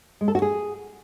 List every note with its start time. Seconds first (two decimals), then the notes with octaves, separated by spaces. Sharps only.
0.21 G#3
0.28 A4
0.35 F#4
0.42 G#4